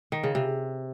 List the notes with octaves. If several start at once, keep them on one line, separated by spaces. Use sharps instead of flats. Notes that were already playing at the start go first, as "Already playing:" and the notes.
D#3
C#3
C3